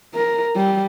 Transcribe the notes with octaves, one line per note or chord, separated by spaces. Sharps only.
A#4
G3